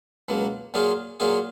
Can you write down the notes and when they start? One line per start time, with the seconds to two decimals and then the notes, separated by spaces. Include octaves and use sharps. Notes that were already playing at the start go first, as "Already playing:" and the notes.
0.28 C#2 B2 F#3 A#3
0.74 A#2 F#3 A#3 F4 G#4
1.20 A#2 F#3 A#3 F4 G#4